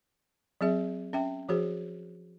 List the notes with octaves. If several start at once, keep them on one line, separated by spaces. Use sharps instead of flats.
F#3 C4 G#4 E5
C#4 E5 G5
F3 F#4 G#4 C5